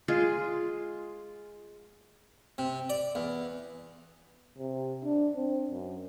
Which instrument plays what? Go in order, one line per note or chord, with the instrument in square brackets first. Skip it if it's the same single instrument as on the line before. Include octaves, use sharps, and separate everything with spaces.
[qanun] G#3 F4 G#4
[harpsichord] C3
D5
E2
[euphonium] C3
D4
C4
F#2